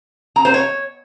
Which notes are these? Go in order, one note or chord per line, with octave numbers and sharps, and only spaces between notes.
A#5
C5
C#5